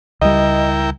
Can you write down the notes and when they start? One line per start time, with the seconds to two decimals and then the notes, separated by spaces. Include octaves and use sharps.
0.22 C#2 G3 E4 A#4 D#5 G5